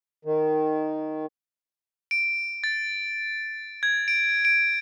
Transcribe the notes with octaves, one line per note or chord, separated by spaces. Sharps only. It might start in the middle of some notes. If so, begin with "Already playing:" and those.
D#3
D7
A6
G#6
D7
D7